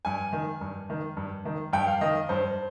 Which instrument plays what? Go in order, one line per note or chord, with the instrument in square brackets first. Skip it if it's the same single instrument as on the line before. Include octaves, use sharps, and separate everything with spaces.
[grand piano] G2 G#5
D#3
G2
D#3
G2
D#3
G2 G5
F5
D#3 D#5
G2 C5